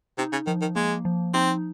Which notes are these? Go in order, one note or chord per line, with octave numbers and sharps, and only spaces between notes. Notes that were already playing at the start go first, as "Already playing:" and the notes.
C3 D#4
C#3
D#3 F3
D#3
G#3 A#3
F3
C4 D#4